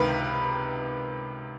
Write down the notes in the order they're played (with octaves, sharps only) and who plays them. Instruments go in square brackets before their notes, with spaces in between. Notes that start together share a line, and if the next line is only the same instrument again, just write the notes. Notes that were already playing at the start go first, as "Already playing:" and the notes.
Already playing: [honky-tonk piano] C#2 C3 D#3 A#4 B4